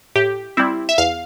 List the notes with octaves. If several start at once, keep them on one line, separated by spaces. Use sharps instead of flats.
A2 G4
G3 C4 E4
E5
E2 F5